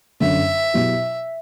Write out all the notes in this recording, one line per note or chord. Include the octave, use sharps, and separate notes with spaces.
G1 F#2 D3 F#3 C#4 E5
B2 F#3 B3 E4 G4